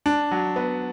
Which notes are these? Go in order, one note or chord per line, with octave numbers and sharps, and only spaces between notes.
D4
F#3
B3